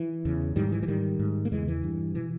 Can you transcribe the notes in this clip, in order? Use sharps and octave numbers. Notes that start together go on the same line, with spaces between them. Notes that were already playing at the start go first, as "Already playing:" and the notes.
Already playing: E3
E2 C#3
G#2 D#3 G3
E3
E3
G#2 D#3 G3
G#2
A#3
E2 C#3 E3 G#3
E3
G2
B2 E3